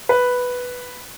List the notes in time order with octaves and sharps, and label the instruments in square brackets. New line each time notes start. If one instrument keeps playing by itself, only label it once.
[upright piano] B4